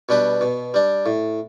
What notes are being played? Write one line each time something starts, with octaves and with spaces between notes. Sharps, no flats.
B2 G3 D4 B4
B2
G3 D4
A2